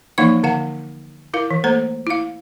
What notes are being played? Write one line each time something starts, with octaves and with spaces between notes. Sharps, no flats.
E3 F3 A#3 D#4 F5 C#6
D3 F5 F#5
E4 A#4 F5
E3
A3 A#3 A4 C5 A#5
E4 F5